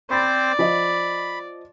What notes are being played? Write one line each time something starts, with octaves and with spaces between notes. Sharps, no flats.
C4 C5 D5 B5 A6
F3 D#5 B5